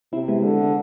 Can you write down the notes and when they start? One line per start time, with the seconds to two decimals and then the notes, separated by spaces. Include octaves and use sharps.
0.13 C3 C4 E4
0.28 G#3 B3
0.44 D3